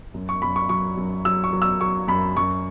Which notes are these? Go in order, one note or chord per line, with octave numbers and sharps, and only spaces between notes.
F#2
C#6
F#2 B5
C#6
F#3 C#6
F#2
F#3 E6
C#6
F#3
E6
F#3 C#6
F#2 B5
F#2 C#6